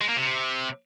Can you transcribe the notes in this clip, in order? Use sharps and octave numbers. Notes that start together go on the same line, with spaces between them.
G#3
A#3
C3